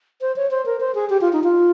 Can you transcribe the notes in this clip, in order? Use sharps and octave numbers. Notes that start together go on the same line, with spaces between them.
C5
C#5
C5
A#4
C5
G#4
G4
F4
D#4
F4